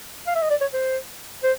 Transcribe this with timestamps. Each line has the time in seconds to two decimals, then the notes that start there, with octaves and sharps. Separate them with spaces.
0.27 F5
0.35 E5
0.42 D#5
0.50 D5
0.61 C#5
0.73 C5
1.43 C5